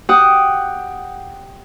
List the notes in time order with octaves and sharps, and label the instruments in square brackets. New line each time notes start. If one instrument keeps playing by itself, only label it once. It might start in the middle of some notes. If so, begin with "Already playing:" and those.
[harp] G4 F#5 D#6